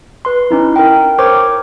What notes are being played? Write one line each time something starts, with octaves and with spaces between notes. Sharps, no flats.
B4 C6
C#4 D#4 E4
A#4 G5
A#4 C5 C#5 C#6 D6